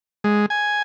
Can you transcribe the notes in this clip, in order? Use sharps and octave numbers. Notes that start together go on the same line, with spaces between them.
G#3
G#5